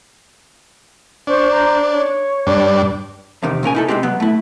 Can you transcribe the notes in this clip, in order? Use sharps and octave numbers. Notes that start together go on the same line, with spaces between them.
D4 C5 C#6
C5 A#5
C#5
G2 D4
E2 C3 D#3
A#2 C#3 A#4 G#5
D#4 E4 A4
C2 G#3 C4 G4
F#3 B3
A3 E4